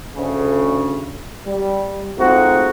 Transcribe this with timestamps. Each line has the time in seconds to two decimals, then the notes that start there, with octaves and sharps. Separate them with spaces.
0.15 D2 C#3
1.45 G3
2.18 G#3 A3 C4 D#4 F4 F#4